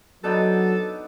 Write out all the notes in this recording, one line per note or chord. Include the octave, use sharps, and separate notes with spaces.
F#3 B3 D4 D#4 A4